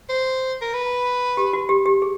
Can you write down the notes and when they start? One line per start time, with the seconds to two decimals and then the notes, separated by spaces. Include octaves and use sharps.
0.09 C5
0.62 A#4
0.74 B4
1.37 G4
1.53 F#4
1.69 G4
1.86 G4
2.02 G#4